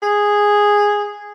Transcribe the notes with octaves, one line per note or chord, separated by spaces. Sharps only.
G#4